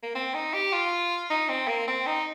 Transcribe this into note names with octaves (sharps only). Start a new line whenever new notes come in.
A#3
C4
D#4
G4
F4
D#4
C4
A#3
C4
D#4